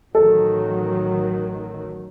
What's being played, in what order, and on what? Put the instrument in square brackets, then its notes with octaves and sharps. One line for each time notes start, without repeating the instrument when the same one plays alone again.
[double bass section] A1 D#3 F#3 [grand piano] A4